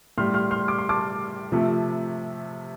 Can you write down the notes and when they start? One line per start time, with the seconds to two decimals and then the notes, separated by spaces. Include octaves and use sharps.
0.18 A2 G3 C6 F6
0.34 C6 F6
0.51 C6 F6
0.68 D6
0.79 C6
0.89 A5 D6
1.52 C3 F3 A3